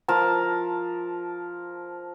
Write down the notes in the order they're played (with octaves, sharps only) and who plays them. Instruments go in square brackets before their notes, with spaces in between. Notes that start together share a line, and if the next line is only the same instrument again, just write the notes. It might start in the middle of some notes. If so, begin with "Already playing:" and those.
[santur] F3 A#4 A5